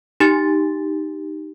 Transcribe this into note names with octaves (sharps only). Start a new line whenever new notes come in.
D#4 G4 A6